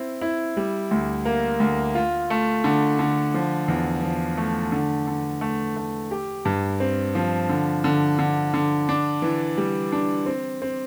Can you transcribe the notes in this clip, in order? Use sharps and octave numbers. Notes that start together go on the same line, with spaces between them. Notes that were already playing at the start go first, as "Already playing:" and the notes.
Already playing: C4 E4
E4
G3
D2
A#3
D2
F4
A3
D3
D3
F3
E2
F3
A3
D3
D3
A3
A3
G4
G2
C4
F3
D3
D3
D3
D3
D4
E3
G3
D4
C4
C4